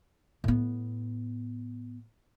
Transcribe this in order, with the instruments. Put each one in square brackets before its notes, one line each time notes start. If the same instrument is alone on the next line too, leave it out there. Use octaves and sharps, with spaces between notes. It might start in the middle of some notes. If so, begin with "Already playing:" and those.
[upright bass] A2 B3